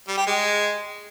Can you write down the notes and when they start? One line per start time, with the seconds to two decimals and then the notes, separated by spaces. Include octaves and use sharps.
0.08 G3
0.17 G4
0.27 G#3